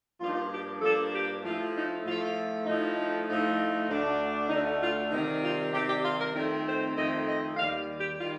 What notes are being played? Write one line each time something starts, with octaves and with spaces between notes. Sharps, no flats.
G2 F3 A#3 D4 F4
D#4
F4
G4
G2 F3 A#3 D4 A4
G4
A2 F3 A3 F4
D#4
A2 F3 A3 F4
A2 F3 A3 D#4
D#4
A2 F3 A3 D#4
D2 D3 A3 D4
D2 D3 A3 D4 D#4
F4
C3 D#3 G3 D#4
F4
C3 D#3 G3 G4
G4
F4
A#4
F2 D#3 A3 C4 D#4 A#4
C5
F2 D#3 A3 C4 D#4 D#5
D#5
D#2 D#3 G3 F5
G4
D#3 G3 F4